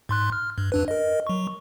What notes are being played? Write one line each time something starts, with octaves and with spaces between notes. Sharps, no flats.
G#2 C6 F#6
F6
G2
F2 D4 B4
A#4 D#5
F#3 C#6